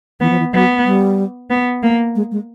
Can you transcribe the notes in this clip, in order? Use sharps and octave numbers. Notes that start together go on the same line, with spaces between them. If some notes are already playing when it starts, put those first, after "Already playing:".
E3 B3
F3
E3
F#3 B3
G3
B3
A#3
G#3
G#3